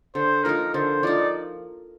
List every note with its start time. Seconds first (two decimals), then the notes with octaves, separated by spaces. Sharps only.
0.15 D3 C5
0.44 F3 A#3 D#4 A#4
0.74 D3 C5
1.03 F3 A#3 D#4 D5